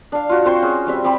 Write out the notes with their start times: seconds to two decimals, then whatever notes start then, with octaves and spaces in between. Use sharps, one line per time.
0.12 D4 F5
0.29 F4 F#4
0.45 C4 C5 C6 C#6
0.62 C#4 G#4
0.87 G3 C4 E5
1.04 C4 G4 B5